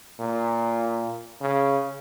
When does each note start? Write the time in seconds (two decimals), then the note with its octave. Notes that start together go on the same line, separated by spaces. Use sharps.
0.19 A#2
1.41 C#3